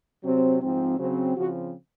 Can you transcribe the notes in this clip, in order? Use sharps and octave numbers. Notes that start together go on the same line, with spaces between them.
C3 F#3 C4
G#2 F3 C4
C#3 F#3 C4
C#3 F3 C4 F#4